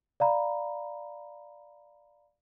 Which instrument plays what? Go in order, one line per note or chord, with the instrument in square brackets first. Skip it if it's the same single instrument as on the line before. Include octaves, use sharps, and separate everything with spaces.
[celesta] D5 F5 A#5 B5